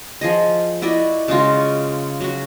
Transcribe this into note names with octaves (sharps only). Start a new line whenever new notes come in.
F3 G#4 D#5
E4 F#4 D5 D#5
C#3 G#3 F4 F#4
F#3 F#4